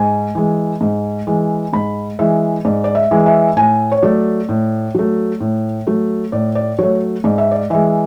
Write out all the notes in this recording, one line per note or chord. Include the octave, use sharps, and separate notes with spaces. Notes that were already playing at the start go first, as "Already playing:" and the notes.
Already playing: G#2 G#5
E3 G#3
G#2
E3 G#3
G#2 B5
E3 G#3 E5
G#2 D5
D5
E5
E3 G#3
E5
A2 G#5
C#5
F#3 A3 D5
A2
F#3 A3
A2
F#3 A3
A2 D5
D5
F#3 A3 C#5
G#2 D5
E5
D5
E3 G#3 E5